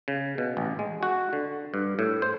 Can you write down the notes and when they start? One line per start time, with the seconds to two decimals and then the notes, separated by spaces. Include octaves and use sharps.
0.08 C#3
0.38 B2
0.57 A1
0.79 G#3
1.03 F#4
1.33 D3
1.74 G2
1.99 A2
2.22 C5